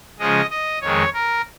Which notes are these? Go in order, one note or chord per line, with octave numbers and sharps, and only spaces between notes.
C#3 F3 G#3 D#5
D#5
F2 D#3 G#3 C#5
A#4